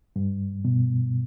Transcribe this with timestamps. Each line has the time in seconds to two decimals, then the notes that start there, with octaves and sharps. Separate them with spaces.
0.16 G2
0.65 B2